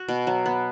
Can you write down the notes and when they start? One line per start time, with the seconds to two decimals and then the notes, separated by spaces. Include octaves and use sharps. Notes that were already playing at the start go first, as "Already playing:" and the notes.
Already playing: F#4
0.08 B2
0.27 F#3
0.46 B3